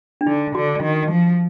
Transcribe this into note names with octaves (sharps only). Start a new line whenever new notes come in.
D4
D3 D#4
D3 F#4
D#3
F3